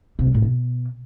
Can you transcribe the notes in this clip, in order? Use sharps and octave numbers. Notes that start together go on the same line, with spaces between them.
C3
G3
A2
B2